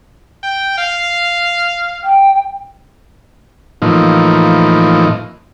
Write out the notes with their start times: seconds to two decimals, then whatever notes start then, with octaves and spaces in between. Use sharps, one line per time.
0.43 G5
0.78 F5
2.04 G5
3.82 A2 E3 F3 A#3 D#4